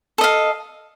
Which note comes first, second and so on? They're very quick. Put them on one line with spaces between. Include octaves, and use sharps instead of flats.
A4 D#5 F5